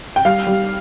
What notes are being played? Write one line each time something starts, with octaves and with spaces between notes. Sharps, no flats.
G5
G3 F5
G3